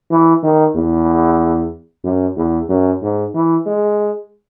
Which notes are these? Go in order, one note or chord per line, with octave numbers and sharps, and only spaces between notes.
E3
D#3
E2
F#2
E2
F#2
G#2
E3
G#3